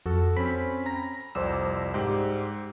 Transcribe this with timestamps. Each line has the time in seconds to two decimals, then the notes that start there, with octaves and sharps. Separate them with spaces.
0.06 F2 F#4 A4
0.37 C4 C#4 B5
0.86 A#5 A#6
1.35 C2 F2 C5 D5 E6
1.94 G#2 G4